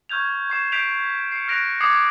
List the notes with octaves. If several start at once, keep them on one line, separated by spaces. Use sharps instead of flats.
C#6 F6 G6 G#6 F7
C#6 C7 E7
G6 B6 C7 D7 F7
C7 C#7
F6 F#6 A#6 D7 F7
D6 D#6 G#6 A#6 C7 C#7